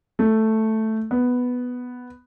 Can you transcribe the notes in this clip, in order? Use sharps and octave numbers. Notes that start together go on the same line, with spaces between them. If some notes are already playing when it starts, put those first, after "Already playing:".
A3
B3